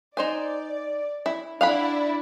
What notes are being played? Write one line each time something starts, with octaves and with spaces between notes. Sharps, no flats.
D#4 C5 D5 G#5
E4
D4 E4 D5 F5 F#5 B5